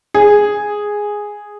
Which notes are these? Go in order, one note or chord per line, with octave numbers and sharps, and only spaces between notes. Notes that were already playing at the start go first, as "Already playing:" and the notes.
G#4